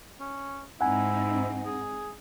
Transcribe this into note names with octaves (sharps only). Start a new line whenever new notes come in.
C#4
G#2 C4 D#4 E4 F#5 G#5
G#4